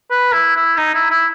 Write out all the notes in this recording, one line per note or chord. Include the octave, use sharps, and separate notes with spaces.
B4
E4
E4
D#4
E4
E4